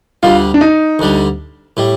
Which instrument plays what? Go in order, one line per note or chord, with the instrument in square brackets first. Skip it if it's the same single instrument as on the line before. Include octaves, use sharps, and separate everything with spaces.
[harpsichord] D2 D3 G3 [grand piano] F4
[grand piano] D4
D#4
[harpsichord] D2 D3 G3
A2 G3